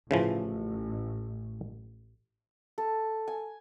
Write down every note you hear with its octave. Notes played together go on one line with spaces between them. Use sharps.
A1 C#3 E3 F3
A4
G#5